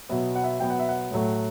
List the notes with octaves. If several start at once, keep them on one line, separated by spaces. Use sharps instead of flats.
B2 F#3 B3 E5
F#5
E5
B2 F#3 B3 G5
F#5
E5
F#5
A2 F#3 A3